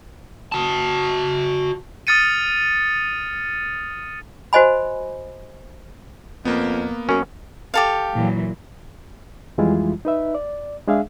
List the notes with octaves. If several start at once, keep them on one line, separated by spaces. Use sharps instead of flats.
F#4 A5
D#6 F6 A6 C#7 D#7
F#4 C5 D#5 G#5 B5
F2 A#3 B3
F#2 C#4
G4 A4 F5
A#2 E3 F#3
F2 E3 G3 G#3 E4 F4
D#4 B4 E5
D5
G#3 D4 G#4 E5 F5